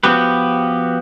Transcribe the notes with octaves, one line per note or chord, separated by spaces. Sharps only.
F3 B3 F#4 G4 B4